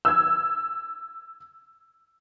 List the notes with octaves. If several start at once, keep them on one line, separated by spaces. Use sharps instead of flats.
E6 G#6